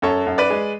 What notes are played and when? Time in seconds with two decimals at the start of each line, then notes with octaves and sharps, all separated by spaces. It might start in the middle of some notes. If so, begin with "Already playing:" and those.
0.02 F#2 A4 C#5
0.27 F#2
0.38 B4 D5
0.50 G#3